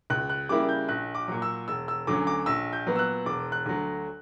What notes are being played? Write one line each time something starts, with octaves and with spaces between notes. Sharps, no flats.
C#2 F#6
F#6
C#3 G3 A#3 E4 D6
G6
A#1 F#6
D6
A#2 F#3
E6
E1 E6
E6
D2 D3 F#3 C#4 D6
D6
A#1 E6
G6
A#2 F#3 B3
E6
F#6
E1 D6
F#6
D2 D3 F#3